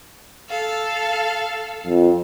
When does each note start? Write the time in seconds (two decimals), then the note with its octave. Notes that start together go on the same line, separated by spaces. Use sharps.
0.49 A4 F5
1.86 F2